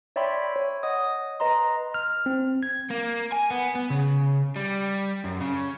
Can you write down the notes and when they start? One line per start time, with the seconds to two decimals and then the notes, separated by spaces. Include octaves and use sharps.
0.16 C#5 D5 E5 G5 B5 C6
0.56 C#5
0.83 D#5 F#5 D#6
1.40 B4 D#5 A#5 C6
1.94 F6
2.26 C4
2.63 G#6
2.90 A#3
3.32 G#5
3.50 B3
3.75 B3
3.90 C#3
4.56 G3
5.24 F#2
5.40 C#3